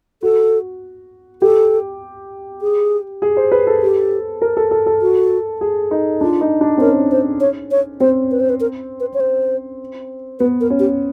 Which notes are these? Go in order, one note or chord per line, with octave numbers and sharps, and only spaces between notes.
F#4 A4
G4 A4
G#4
G#4
C5
B4
A4
G4
A#4
A4
A4
A4
F#4
G#4
D#4
D4 F4
D#4
D4
C4
C#4 A#4
C5
C#5
C#5
C4 C5
B4
C5
B4
A#4
B4
C#5
C5
B3 B4
A#4
C#4
G4